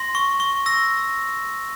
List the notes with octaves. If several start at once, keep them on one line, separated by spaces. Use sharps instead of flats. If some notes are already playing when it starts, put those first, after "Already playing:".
Already playing: C6 A#6
C#6
C#6
E6 A#6